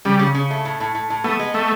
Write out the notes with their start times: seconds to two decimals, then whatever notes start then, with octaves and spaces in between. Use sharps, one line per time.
0.05 C#3 G3
0.19 C#3
0.35 C#3
0.50 A3
0.65 A2
0.80 A2
0.95 A2
1.10 A2
1.24 A3 B3
1.39 G#3
1.54 A3 B3